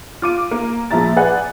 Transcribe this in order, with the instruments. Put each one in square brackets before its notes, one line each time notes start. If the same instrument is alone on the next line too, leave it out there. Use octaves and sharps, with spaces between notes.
[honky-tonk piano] F4 D6 D#7
A#3
A#2 F3 G#3 E4 A#5 A6
G#4 B4 D5 F#5 G#5